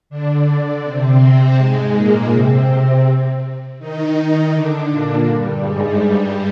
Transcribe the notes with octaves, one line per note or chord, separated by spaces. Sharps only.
D3 D4
C3 C4
G#2 G#3
A#2 A#3
C3 C4
C3 C4
D#3 D#4
D#3 D#4
D3 D4
A#2 A#3
G2 G3
G#2 G#3
G2 G3